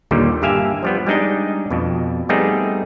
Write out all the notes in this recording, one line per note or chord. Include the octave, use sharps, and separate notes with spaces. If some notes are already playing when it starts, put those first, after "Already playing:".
D#2 A#2 D3 G3
G2 A#3 G4 E5 F5 G#5
F3 G3 B3
G3 G#3 D4 D#4 D#5
F2 B2
G3 A3 B3 C4 D#4 G#4